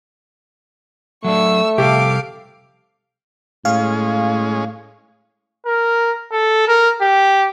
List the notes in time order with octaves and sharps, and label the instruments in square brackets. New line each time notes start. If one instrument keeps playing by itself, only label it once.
[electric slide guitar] F#3 D4 [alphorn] A3 [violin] C#6 E6
[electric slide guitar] C3 F3 G3 [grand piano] G4 A4 [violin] F5 D6
[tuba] A2 [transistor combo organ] G#3 C#4 [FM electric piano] F5
[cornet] A#4
A4
A#4
G4